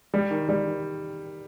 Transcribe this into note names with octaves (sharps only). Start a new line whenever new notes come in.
G3
D#3
G3
D#3